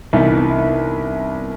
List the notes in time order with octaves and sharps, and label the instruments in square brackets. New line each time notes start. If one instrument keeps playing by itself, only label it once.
[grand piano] C2 E3 [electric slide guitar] B3 D4 D#4